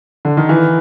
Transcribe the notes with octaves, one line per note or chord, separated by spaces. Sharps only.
D3
D#3
E3